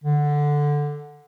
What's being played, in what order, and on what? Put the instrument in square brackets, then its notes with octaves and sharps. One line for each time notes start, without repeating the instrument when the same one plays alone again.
[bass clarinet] D3